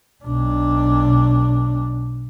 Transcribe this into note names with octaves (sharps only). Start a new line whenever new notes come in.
B1 D4